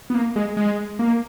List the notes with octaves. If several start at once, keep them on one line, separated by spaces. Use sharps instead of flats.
B3
A#3
G#3
G#3
A#3